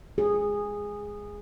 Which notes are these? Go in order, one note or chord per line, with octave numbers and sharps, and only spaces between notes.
G#4